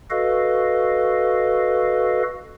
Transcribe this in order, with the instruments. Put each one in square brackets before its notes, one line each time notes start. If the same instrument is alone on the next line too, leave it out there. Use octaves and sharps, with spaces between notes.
[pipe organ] F#4 A4 B4 D#5 F5